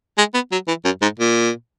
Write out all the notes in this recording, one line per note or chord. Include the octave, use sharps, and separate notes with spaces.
G#3
B3
F#3
E3
F#2
G#2
A#2